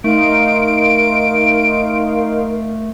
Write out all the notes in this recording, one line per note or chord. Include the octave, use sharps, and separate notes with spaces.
A3 D#4 A#4 F5 C6 D7